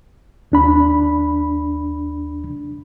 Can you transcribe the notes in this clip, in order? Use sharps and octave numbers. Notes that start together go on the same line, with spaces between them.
D#2 D4 B5